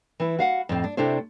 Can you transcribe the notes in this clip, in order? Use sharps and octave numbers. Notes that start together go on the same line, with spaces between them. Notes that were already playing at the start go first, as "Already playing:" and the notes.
E3 E4
F#4 F5 F#5
F2 A2 C4
D4
C3 A3 D4 E4 C5